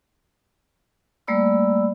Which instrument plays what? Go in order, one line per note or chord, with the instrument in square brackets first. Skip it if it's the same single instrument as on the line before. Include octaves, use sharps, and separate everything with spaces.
[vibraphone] G3 A3 A#3 D5 B5 E6